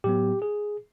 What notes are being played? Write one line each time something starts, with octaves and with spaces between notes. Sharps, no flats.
A2 F#3 B3 G4
G#4